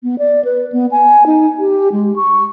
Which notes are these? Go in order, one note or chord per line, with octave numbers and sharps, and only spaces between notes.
B3
D5
B4
B3
G#5
D#4
G4
G#3
C#6